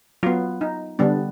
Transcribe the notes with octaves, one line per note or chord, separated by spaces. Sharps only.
F#3 B3 F4
D#4
D3 G3 B3 D4